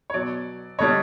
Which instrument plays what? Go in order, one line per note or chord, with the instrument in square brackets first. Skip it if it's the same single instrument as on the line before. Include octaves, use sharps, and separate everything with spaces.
[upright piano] C#5
B2 F#3 D5
D3 G3 C#5 D#5